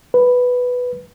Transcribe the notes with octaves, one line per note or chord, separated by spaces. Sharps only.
B4